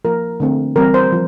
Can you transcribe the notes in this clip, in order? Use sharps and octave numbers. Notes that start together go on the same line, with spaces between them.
F3 A#3 A#4
D3 A3 C4
E3 G3 C4 A#4
C5
F3